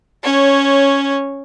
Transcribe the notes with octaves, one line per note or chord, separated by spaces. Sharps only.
C#4 C#5